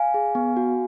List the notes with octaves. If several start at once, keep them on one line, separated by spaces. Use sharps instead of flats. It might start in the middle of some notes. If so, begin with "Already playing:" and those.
Already playing: F5 G#5
G#4
B3
F#4